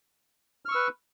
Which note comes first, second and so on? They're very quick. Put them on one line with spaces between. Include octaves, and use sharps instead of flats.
F6 C#6 E6 B4